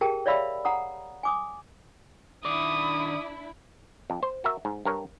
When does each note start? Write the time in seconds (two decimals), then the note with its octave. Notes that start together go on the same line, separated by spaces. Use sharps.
0.01 G4 G#4 A#4 G5 A5
0.26 C#5 D5 E5 F5 B5 E6
0.65 F#5 A#5 D#6
1.23 G#5 D6 D#6
2.45 D#3 D4 E4 D5 D6 D#6
4.10 F2
4.23 C5
4.44 F#4 A#4 E5
4.65 G#2
4.85 G2 A#4 C#5